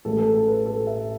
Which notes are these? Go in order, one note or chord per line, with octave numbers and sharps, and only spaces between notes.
A1 A2 G#3 A4
A4
A4
B4
A4
E5